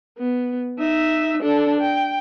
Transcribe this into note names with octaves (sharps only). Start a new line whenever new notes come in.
B3
D#4 E5
D4 A4
G5